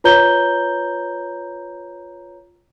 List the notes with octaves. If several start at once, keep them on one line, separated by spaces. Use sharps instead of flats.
F4 B4 C#5 A#5 G6 G7